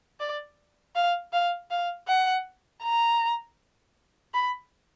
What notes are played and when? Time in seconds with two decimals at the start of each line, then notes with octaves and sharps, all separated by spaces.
0.20 D5
0.95 F5
1.33 F5
1.71 F5
2.08 F#5
2.83 A#5
4.34 B5